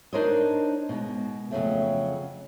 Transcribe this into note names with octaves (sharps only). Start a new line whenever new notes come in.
D4 D#4 A#4 C5 C#5 D#5
B2 G#3
F2 C#3 F#3 A3